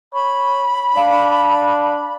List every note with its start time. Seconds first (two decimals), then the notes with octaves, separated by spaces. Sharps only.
0.14 C#5 B5
0.96 D4 D5 F5